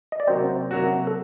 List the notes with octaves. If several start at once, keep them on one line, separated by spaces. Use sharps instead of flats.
D#5
D5
C3 F#3 A#3 C4 F#4 C5
C3 F#3 A#3 F#4
A4